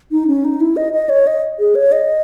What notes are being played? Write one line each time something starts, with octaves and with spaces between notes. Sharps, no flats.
D#4
C#4
D#4
E4
D#5
D#5
C#5
D#5
G#4
C#5
D#5